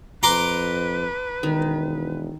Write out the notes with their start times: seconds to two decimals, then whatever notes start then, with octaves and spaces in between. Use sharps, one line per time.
0.23 F2 B4 A#5 C6 D6
1.43 E1 D#3